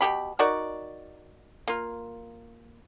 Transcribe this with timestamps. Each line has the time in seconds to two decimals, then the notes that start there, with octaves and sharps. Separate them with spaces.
0.01 B2 A#3 G4 B5
0.39 D#4 F#4 A#4 D5
1.68 A#3 F4